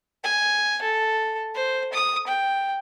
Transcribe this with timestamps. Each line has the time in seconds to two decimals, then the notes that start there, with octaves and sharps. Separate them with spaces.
0.24 G#5
0.82 A4
1.55 C5
1.93 D#6
2.27 G5